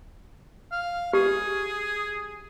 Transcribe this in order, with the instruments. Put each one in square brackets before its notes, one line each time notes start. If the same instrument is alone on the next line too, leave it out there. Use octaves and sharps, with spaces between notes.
[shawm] F5
[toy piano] G4 [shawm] G#4